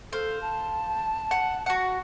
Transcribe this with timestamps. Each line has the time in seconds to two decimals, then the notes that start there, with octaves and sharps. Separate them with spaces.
0.13 A4 C5 F5
0.42 A5
1.31 F#5
1.66 F#4 F#5